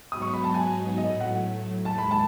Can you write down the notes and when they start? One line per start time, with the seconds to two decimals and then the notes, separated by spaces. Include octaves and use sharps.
0.11 G#2 F#3 B3 D#4 F#4 D#6
0.22 C#6
0.34 B5
0.44 A5
0.55 G#5
0.98 A2 F#3 A3 D#5
1.21 F#5
1.85 D#2 D#3 G#3 A5
1.98 B5
2.11 A5